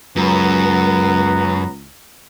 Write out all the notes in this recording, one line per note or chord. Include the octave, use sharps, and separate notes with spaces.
C#2 F#2 B3 B4 A#5